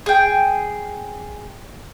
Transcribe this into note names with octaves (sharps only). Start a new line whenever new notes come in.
G#4 G5